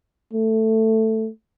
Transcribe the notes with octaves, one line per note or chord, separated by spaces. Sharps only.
A3